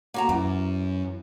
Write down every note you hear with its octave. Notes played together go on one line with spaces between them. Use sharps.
A#3 F#4 A#5
F#2 E3